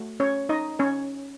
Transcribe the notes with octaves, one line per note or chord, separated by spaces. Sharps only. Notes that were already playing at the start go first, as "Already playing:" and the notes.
Already playing: A3 F#4
C#4 C#5
D#4 D#5
C#4 C#5